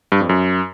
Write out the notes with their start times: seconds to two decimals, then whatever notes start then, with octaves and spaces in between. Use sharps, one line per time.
0.12 G2
0.21 F2
0.29 F#2